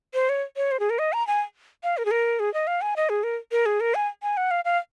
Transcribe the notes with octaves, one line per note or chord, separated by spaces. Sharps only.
C5
C#5
C#5
C5
G#4
A#4
D#5
A#5
G#5
F5
A#4
G#4
A#4
G#4
D#5
F5
G#5
D#5
G#4
A#4
A#4
G#4
A#4
G#5
G#5
F#5
F5
F5